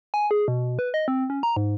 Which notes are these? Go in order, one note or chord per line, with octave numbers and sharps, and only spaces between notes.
G#5
G#4
B2
B4
D#5
C4
C#4
A#5
G#2